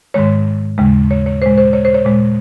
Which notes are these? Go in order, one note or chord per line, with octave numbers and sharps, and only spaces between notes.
G#2 D#3 G#3 C#5
D#2 C#3 G#3
C#5
C#5
A#2 G#3 C5
C5
C#5
C5
C#5
A#2 G#3